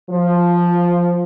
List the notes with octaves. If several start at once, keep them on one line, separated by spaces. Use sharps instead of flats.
F3